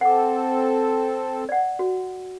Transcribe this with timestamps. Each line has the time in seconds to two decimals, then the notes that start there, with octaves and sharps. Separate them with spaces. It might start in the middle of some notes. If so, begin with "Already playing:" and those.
0.01 C4 A4 F#5 D6
1.49 D5 F#5
1.79 F#4